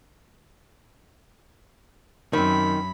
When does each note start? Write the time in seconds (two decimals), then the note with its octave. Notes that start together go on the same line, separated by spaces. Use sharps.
2.33 F#2 D#3 C4 B5